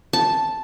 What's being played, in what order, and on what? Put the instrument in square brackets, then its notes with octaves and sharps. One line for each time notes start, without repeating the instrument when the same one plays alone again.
[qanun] A5